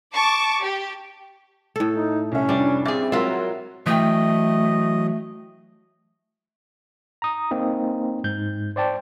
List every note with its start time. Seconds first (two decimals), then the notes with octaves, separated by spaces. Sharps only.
0.13 A5 C#6 D6
0.62 G4
1.76 A2 A4
1.95 D#4
2.32 C2 C#4 E5
2.49 F1 G3 D4
2.85 G2 C4 G#4 E5 D6 A6
3.12 F#3 G#3 F4 A#4 E5 F#5
3.86 E3 F#3 A3 D#5 G5
7.22 A#5 D#6
7.51 A#3 C4 D#4
8.24 G#2 G6
8.76 C5 D5 G5 A5